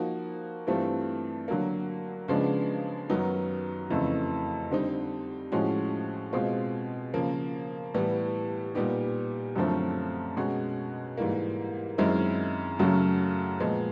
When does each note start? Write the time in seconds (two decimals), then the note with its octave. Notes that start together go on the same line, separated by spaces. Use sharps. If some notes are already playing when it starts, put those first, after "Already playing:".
Already playing: F3 A#3 D#4 F#4
0.67 G2 E3 A3 C4 F4
1.48 D3 F#3 A#3
2.28 C#3 F3 G#3 B3 D4
3.10 F#2 D#3 F#3 B3 D#4
3.90 F2 C#3 E3 A3
4.71 D3 G3 C4 D#4
5.52 A2 F3 G#3 C#4 F#4
6.33 B2 G#3 C4 F4
7.14 C#3 F3 A#3
7.94 A2 E3 G3 B3
8.75 A#2 G3 B3 D#4 G4
9.56 F#2 D3 F3 A3 C4
10.37 B2 G#3 C#4 F#4
11.17 G#2 E3 G3 A#3
11.98 F#2 D#3 G#3 C4 E4
12.79 F#2 C#3 F#3 A3
13.60 A#2 F3 G#3 B3